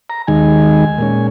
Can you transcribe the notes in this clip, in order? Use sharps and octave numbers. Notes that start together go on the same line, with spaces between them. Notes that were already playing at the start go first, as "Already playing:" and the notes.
A#5
D#2 D#3 G#3 G#5
A#2 G#3 C#4